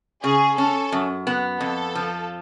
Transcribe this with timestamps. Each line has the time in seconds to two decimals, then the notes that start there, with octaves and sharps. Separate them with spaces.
0.23 C#3 G#4
0.58 C#4 A4
0.92 F#2
1.27 B3
1.61 F2 A4
1.95 F3